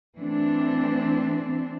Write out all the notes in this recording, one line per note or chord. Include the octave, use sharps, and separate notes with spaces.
E3 A3 C4 D4